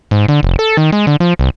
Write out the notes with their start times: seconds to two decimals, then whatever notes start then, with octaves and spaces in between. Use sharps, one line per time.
0.11 G#2
0.28 D3
0.43 F1
0.59 A4
0.77 D#3
0.92 G#3
1.07 D3
1.20 F3
1.39 C2